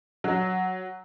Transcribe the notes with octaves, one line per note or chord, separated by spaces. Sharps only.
F#3